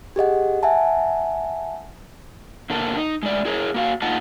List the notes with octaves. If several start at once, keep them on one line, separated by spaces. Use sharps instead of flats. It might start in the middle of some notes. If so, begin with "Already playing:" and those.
G4 G#4 D#5 F#5
E5 F#5 G#5 A5
B2 D3 A#3 A4
D#4
G#3 A3 D5
E4 G#4 A#4 C#5
A#3 F#4 F5
A#3 D#4 F4 D#5 F#5 A5